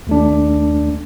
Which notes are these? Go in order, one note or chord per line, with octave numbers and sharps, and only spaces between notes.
D#2 A3 D4